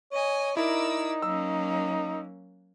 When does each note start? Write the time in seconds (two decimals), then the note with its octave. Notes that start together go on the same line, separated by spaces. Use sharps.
0.12 C#5 D#5 G#5
0.57 D#4 E4 A#4 D5 E6
1.22 F#3 A#3 C#4 E6